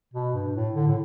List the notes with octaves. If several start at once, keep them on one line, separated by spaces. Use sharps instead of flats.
B2
G2
A2
D3
A2